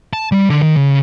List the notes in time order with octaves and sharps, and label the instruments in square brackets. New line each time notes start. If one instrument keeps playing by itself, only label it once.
[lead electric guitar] A5
G3
D3
D#3
C#3